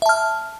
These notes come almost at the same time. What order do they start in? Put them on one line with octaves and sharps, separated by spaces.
E5 A5 F6